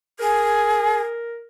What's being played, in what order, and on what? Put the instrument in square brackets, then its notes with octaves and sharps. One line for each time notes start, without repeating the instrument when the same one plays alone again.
[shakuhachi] G#4 [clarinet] A#4